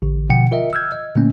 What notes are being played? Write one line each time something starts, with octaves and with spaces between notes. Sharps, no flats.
A1 D3
B2 D3 F3 F#5 G5 C#7
F4 A#4 D#5 E5
E6 F6 G6 G#6
D#5
A#2 D3 A3 A#3 C#4